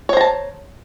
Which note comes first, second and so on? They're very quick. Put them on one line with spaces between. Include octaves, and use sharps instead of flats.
C#5 C5 A#5 A5